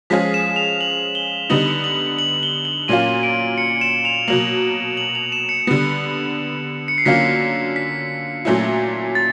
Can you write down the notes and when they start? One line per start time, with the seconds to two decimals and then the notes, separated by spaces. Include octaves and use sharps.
0.10 F3 G#3 C#4 F4 G#4 B6
0.34 E7
0.56 F7
0.81 F#7
1.15 G7
1.50 D3 G3 B3 D#4 F#7
1.84 F#7
2.19 F#7
2.43 G7
2.65 F#7
2.88 A#2 F#3 A#3 C#4 F4 D#7
3.23 D7
3.58 C#7
3.81 E7
4.05 F7
4.28 B2 F#3 A#3 F#7
4.97 F#7
5.15 F7
5.32 E7
5.49 C#7
5.67 D3 G3 B3
6.88 C#7
6.98 C7
7.05 D3 F#3 A#3 C#4 F4 B6
7.76 B6
8.45 A#2 F#3 A3 C#4 E4
9.15 A6